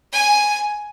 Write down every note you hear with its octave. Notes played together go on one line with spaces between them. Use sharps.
G#5